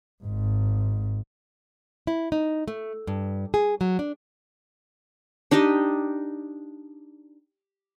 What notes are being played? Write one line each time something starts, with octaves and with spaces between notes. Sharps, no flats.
G#1 G#2
E4
D#4
A3
G2
G#4
F#3
D4
D4 D#4 G4 D#5